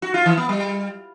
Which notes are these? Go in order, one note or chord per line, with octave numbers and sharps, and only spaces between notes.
F#4
F4
E3
B3
G3